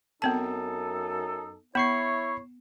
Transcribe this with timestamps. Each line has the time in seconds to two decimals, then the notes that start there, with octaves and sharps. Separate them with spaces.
0.22 F#2 B3 C4 D#4 A4 A5
1.75 B3 E4 C#5 B5 C#6 C7